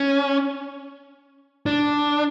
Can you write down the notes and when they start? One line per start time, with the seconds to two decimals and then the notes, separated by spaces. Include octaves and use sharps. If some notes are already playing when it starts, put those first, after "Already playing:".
Already playing: C#4
1.66 D4